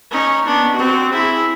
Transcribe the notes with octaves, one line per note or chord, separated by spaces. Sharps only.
C#4 D#4
B3 D4
C4 F#4
E4 G#4